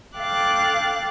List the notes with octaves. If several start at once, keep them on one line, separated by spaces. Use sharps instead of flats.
A4 F5 G5 D6 F#6 A6